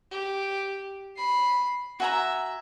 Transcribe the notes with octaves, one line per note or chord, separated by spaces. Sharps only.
G4
B5 C7
F#4 E5 G#5 A#5